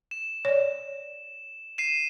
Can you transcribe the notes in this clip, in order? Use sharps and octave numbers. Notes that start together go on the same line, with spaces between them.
E7
C#5 D5
C7 D#7 E7